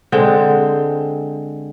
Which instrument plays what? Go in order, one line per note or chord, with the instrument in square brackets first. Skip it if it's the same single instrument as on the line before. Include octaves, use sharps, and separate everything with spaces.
[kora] D3 G#3 C4 G5